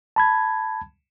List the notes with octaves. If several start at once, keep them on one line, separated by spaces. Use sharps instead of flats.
A5 B5 G#6